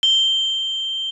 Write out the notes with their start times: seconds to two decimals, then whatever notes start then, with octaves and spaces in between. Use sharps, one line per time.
0.03 G7